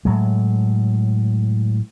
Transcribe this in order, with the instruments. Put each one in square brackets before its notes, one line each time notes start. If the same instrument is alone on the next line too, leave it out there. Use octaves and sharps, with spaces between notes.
[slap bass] A2 F#3 G#3